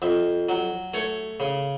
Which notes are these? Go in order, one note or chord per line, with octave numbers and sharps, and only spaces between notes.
F2 E5
F#3
A3 C#5
C#3